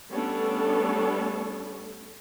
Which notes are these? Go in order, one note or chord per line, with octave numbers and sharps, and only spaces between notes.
G3 A3 B3 C#4 D4 A4